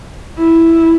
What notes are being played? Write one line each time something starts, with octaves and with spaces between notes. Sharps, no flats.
E4